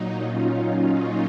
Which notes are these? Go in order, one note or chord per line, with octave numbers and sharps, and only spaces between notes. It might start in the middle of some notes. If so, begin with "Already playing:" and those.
Already playing: A#2 F#3 D#4
C#4 F4